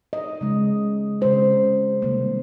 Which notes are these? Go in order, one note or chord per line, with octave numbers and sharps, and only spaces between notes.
D#5
C#3 G#3
C#3 G#3 C5
C3 D#3 G3 A#3